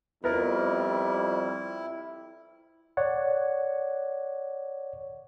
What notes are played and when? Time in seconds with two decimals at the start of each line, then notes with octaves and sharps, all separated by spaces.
0.24 F2 G3 B3 E4 A#4
2.97 C#5 D5 F#5